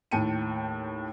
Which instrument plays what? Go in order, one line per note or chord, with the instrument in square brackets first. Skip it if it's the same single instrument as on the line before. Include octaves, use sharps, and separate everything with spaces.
[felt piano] D#2 A2 G5 A5 C#7 D#7